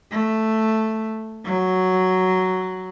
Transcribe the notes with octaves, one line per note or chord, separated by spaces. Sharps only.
A3
F#3